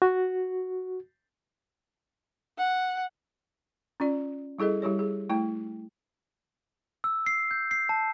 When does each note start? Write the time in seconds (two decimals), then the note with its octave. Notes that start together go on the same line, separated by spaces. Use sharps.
0.02 F#4
2.58 F#5
4.00 C#4 F4 D5
4.59 G3 E4 G#4 A4 D#5
4.82 G3 E4 G4 C#5
4.99 G#4
5.30 A3 E4 G5
7.04 E6
7.26 C7
7.51 G6
7.71 C7
7.89 A5